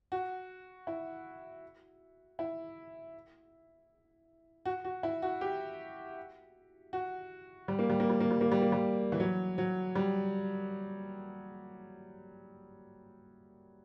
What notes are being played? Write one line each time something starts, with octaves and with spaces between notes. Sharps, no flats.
F#4
E4
E4
F#4
F#4
E4
F#4
G4
F#4
G3
A#3
G3
A#3
G3
A#3
G3
A#3
G3
A#3
G3
E3
F#3
F#3
G3